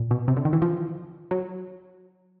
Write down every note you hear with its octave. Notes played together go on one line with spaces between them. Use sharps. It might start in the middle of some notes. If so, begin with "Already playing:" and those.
Already playing: A#2
B2
C3
D3
D#3
E3
F3
F#3